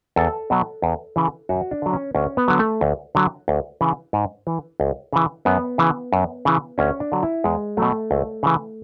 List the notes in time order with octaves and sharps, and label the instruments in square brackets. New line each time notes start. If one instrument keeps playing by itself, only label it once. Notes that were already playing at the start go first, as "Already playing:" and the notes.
[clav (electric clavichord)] E2 A4
B2 F#3
E2
C#3 E3
F#2 F#4
D4
D3 F#3
C#4
D2 C#4
B3
D3 F#3
A3
D2
D3 F#3
D2
C#3 E3
G#2
E3
C#2
C#3 E3
F#2 B3
C#3 E3
F#2
C#3 E3
D2 C#4
D4
D3 F#3
E4
E2 G#3
B2 F#3 A3
C#2
C#3 E3